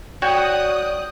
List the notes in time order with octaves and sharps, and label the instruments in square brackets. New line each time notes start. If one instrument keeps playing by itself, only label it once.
[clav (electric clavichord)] F#4 C#5 [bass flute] D5 [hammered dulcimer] G5 [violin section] D#6 F#6